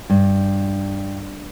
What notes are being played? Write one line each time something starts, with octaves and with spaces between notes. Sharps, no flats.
G2